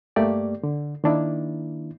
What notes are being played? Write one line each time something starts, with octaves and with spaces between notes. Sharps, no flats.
G2 A3 A#3 G4 D5
D3
D#3 A#3 D4 E4